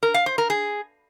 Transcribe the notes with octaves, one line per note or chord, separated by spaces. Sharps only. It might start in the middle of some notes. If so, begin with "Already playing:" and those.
A#4
F5
C5
A#4
G#4